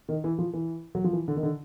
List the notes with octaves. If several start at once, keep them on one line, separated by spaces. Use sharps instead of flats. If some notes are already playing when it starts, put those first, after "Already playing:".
D#3
E3
F3
E3
F#3
F3
E3
D3
D#3
D3